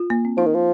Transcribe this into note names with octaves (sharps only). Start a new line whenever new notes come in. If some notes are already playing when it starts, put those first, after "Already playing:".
Already playing: F4
A#3
C4
F3 D#4
D#3
F3